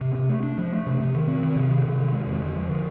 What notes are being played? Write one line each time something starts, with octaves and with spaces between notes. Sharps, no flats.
C3
C3
A3
D4
F3
A3
C3
C3
D#3
C4
D#3
C3
D#3
C3
D#3
G#3
F2
D3
F3
D3